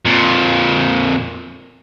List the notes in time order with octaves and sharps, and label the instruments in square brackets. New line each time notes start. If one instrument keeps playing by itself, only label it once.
[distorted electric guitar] F2 A#2